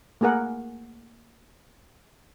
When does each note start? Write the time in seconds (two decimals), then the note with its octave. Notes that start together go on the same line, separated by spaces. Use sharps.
0.21 A3 A#3 G#4 A#4 F#5